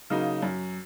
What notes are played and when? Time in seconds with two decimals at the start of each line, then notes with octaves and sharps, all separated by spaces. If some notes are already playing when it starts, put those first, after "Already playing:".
0.10 C#3 F#3 A#3 D#4
0.43 F#2